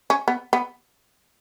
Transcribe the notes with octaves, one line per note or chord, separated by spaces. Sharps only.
C#4
B3
B3